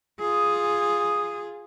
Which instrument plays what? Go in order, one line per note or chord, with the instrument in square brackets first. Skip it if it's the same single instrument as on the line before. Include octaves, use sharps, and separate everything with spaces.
[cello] F4 G#4 [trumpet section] D#6